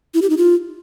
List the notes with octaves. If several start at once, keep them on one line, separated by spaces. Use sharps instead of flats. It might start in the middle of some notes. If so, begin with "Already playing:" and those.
E4
G4
D#4
F4